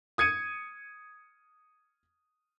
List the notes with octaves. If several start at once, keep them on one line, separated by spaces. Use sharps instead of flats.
D#6 G#6 C#7 D#7